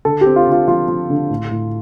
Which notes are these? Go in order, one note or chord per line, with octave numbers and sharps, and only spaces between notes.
D3 A4
C4 G4
F4
D3 F4
F3 F4
F3
D3
A2
A2